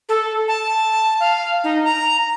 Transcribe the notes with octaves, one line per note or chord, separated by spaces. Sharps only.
A4
A5
F5
D#4
A#5